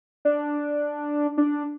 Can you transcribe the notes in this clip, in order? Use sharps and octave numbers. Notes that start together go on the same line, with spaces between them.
D4
D4